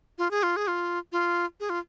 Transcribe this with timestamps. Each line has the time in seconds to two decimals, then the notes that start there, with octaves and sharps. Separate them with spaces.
0.18 F4
0.31 G#4
0.43 F4
0.56 G#4
0.68 F4
1.12 F4
1.60 G#4
1.70 F4